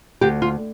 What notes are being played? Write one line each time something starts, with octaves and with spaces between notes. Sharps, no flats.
D2 G4
F4